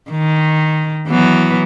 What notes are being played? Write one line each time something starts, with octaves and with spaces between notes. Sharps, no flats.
D#3
E3 F#3 B3